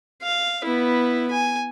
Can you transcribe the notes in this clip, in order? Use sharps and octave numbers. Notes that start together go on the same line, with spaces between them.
F5
B3 E4
G#5